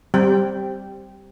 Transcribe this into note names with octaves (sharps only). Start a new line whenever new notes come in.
G3 C4 G4 G5